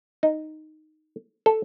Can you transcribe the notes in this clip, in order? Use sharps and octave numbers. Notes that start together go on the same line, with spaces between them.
D#4
A4